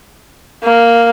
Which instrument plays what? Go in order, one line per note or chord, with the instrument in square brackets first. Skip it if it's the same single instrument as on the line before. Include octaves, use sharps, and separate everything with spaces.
[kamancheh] A#3